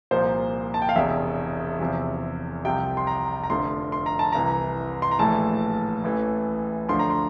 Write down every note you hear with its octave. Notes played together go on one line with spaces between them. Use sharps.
C2 A#2 F3 C5
A5
G5
F5
E1 E2 C3 E5
E2 C3 F3
C2 C3 F3 G5
C6
A#5
A#5
F1 F2 D3 F3 C6
C6
A#5
A5
C2 C3 E3 A#5
C6
A#5
A#1 A2 E3 A5
A1 A2 E3
D2 D3 F3 C6
A#5
C6